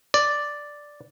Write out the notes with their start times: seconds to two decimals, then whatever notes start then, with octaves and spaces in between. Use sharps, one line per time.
0.14 D5